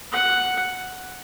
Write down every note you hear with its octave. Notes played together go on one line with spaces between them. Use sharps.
F#5